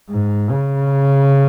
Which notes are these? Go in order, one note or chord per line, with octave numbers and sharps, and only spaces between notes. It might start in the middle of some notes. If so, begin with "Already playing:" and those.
G#2
C#3